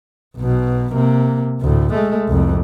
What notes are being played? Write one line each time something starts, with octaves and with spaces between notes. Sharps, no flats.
B1 B2
C3 A#3
D2 A2
G#3 A3
C2 F2